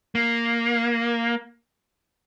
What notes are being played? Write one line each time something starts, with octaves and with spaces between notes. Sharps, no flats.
A#3